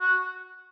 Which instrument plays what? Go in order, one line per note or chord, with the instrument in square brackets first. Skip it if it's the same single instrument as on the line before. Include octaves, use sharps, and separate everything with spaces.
[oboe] F#4